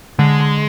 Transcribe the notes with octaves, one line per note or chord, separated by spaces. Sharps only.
D3 G#3
D3